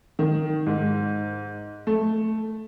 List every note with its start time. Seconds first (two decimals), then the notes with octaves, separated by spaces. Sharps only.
0.19 D#3
0.66 G#2
1.87 A3